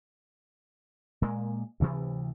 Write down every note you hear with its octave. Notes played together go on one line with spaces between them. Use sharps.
A#2 G#3 A#3
D2 C3 E3